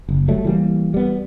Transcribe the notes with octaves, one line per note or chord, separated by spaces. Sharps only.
F#1
F#3 G3 A3
E3 G3 A#3
G3 B3